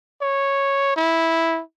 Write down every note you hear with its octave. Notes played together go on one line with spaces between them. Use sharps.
C#5
E4